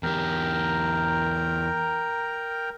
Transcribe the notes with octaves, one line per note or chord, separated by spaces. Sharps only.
E2 G4 A#4 G5 A#5